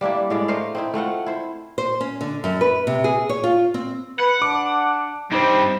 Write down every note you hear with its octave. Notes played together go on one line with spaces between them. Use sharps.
G3 A#3 D4 E4
A2 G#3 D5
A3 A#4 C5 F5
C4 D#4 E4
A3 C4 F4 F#5
E4 C5
C5
C#4
D3
F#2
B4
C3
G#4
C#5
F4
C4
B4 F#5
D4 D6
G2 G3 C4 D#4 C5